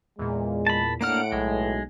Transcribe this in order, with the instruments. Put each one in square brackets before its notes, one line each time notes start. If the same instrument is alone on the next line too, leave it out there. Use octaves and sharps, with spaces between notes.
[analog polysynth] E2 A#2 [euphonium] G#3
[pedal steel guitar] A5 B5
[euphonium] A2 [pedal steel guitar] A#3 D4 F6 [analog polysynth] F#5 D7
[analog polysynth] B1 [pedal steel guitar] G#3